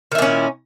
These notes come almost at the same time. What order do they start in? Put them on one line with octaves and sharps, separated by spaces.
D#3 E4 A#2 C#4